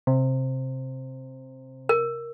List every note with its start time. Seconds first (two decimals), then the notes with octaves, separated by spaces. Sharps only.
0.07 C3
1.89 A#4